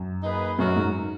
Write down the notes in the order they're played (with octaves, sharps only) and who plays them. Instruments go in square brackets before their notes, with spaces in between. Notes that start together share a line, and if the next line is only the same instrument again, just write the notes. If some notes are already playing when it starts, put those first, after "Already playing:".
Already playing: [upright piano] F#2
[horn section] A#3 D#4 G#4 B4
[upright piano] F#2 [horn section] F#3 C#4 F#4 A#4
[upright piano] G#2